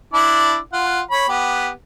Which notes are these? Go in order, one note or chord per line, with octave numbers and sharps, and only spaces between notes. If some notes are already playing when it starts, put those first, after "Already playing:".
D4 E4 D5
F4 F#5
C#5 B5
B3 G4